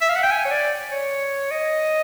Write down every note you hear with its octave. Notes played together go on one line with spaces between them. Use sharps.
E5
F5
F#5
G5
G#5
C#5
D5
C#5
D#5